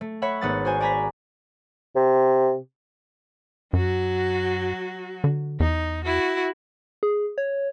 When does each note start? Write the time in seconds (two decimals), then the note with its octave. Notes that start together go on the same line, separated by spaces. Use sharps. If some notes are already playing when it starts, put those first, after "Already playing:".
0.01 A3
0.22 C#5 E5 F#5 B5
0.41 G#1 B3 F#5 D#6 A6
0.65 F#4 G#4 C5 G#5
0.80 D5 G#5 A#5 B5 G#6 B6
1.95 C3
3.73 F#2 F#3 F#4
5.24 D3
5.60 E2 D#4
6.04 E4 F#4
7.03 G#4
7.38 C#5